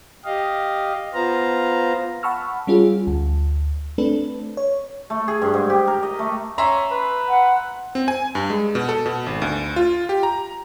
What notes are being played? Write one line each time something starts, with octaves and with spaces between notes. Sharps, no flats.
G4 D#5 F5
B3 F4 C5 F5 A#5
F#5 A5 B5 C#6 E6 F6
G3 C#4 F4 G#4
D2
A3 C4 D4 A4 B4
C#5
A3
G#4
G2
G#2
G4
A#4
D#5
A3
C#4 E5 A#5 C6
B4
F#5
C4
G#5
G2
G#3
B2
A4
B2
G#1
D2
F4
G4
A#5